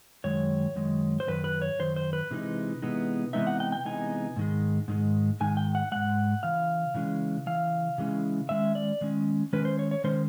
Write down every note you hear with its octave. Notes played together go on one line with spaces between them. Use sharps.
F#2 D#3 G#3 C#5
F#2 D#3 G#3
C5
F#2 D#3 B4
B4
C#5
F#2 D#3 C5
C5
B4
C3 E3 G#3 B3 D#4
C3 E3 G#3 B3 D#4
C3 E3 G#3 B3 D#4 E5
F#5
G5
G5
C3 E3 G#3 B3 D#4 G#5
G#2 D#3 G#3
G#2 D#3 G#3
G#2 D#3 G#3 G#5
G5
F#5
G#2 D#3 G#3 F#5
C#3 E3 F5
C#3 E3 G#3 C#4
C#3 E3 F5
C#3 E3 G#3 C#4
D#3 G#3 C#4 E5
D5
D#3 G#3 C#4
D#3 G#3 C#4 B4
C5
C#5
C#5
D#3 G#3 C#4 C5